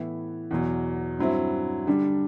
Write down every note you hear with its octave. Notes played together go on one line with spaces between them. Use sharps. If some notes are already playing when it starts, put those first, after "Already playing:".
Already playing: A2 E3 B3 E4
E2 B2 F#3
G2 F#3 C4 E4
D3 G3 D4